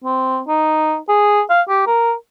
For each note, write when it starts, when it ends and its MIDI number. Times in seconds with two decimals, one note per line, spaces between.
0.04 0.41 60
0.48 0.97 63
1.09 1.41 68
1.50 1.62 77
1.69 1.85 67
1.87 2.13 70